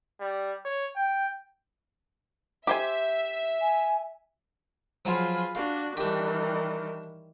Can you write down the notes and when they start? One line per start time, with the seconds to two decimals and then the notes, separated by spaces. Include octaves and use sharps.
0.20 G3
0.65 C#5
0.96 G5
2.67 G4 C5 E5 G#5
3.62 G#5
5.05 F3 F#3 F4 G#4 B4
5.55 D4 F#4 F5
5.97 D#3 E3 G3 D4 G4